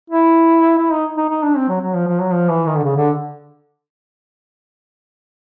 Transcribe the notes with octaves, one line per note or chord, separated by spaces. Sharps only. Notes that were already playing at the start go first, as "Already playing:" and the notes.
E4
E4
D#4
D#4
D#4
D4
C4
F#3
F#3
F3
F3
F#3
F3
E3
D#3
D3
C#3
D3